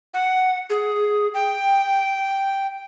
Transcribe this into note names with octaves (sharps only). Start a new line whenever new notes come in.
F#5
G#4
G5